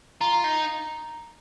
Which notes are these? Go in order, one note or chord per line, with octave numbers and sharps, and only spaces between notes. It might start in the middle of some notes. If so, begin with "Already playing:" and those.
F4 A#5
D#4